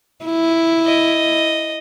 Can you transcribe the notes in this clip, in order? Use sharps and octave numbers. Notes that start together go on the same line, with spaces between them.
E4
D#5